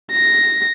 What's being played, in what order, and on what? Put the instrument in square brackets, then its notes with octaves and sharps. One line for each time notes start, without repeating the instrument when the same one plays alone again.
[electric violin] A#6